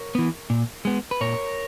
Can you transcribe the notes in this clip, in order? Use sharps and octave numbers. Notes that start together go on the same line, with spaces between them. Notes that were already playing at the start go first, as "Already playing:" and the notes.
Already playing: A#4 C#5
E3 B3
A#2
G#3 B3
B4
A#2 A#4 C#5